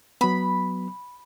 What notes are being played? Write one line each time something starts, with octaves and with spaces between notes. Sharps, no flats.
F#3 B3 B5